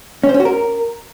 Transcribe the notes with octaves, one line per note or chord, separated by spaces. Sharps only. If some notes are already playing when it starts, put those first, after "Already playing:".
C#4
C5
C#4
F#4
A#4